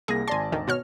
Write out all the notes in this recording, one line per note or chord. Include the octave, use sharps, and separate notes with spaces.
C2 A#3 G#4 A#6
G#1 D5 G#5 A5 C6
D2 D#3
B2 C#5 F6